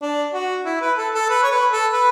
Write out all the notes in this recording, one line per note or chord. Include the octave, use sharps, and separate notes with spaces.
D4
F#4
E4
B4
A4
A4
B4
C#5
B4
A4
B4